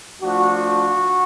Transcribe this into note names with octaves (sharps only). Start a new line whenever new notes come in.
F3 A3 D4 F#4